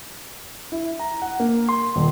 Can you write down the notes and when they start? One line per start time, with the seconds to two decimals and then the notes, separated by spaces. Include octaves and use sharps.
0.72 E4
0.99 A#5
1.22 F#5
1.40 A#3
1.69 C6
1.96 D#1